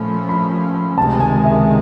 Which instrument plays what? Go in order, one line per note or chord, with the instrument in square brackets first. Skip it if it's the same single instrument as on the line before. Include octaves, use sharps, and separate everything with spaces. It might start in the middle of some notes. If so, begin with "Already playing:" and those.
Already playing: [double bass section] A#2 F3 A3 C#4 [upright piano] B5
[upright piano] B5
[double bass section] C#2 C3 D#3 G#3 [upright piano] A5
[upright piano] G#5
E5